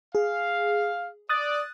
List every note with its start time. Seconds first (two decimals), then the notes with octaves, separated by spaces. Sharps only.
0.15 G#4 F5
1.29 D5 D#6 F#6 A6